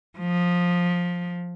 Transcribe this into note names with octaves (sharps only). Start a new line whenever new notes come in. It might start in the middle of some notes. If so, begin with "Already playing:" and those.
F3